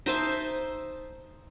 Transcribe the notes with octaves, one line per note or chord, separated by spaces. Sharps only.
D#4 C5 E5 A5